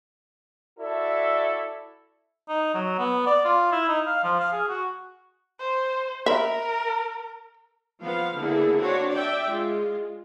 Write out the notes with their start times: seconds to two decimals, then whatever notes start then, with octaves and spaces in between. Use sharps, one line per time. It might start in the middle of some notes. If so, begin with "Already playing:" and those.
0.79 E4 F#4 A4 D5 E5
2.48 D#4
2.74 F#3
2.99 B3
3.26 D5
3.45 F4
3.72 E4
3.88 D#4
4.07 F5
4.24 F3
4.40 F5
4.53 G#4
4.68 F#4
5.60 C5
6.26 A#4 E5 B5
8.02 F3 B3 F5
8.37 D3 A#3 B3 E4 G#4 A4
8.77 C4 D4 F#4 C#5
9.11 D5 E5 G5
9.46 G#3 F4